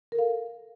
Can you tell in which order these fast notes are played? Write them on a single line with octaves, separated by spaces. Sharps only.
A#4 A4 F5